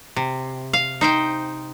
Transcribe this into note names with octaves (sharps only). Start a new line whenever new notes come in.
C3
F5
D#4 C5 G5